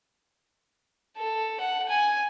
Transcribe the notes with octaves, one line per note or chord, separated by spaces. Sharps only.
A4
F#5
G#5